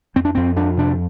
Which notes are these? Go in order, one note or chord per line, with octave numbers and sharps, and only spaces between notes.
F2 C4
D4
F2 C4
F2 D4
C3 D4